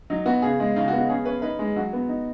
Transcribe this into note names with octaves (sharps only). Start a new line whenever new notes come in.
F#3 D#4
B3 F#4
C#3 G#4
G#3
C#3 D#4
F#4
B3
F#4
C#4 G#4
C#4 B4
D#4 B4
G#3
F#3 F#4
B3
D#4